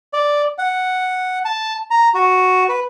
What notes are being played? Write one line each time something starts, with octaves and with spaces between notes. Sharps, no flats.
D5
F#5
A5
A#5
F#4
B4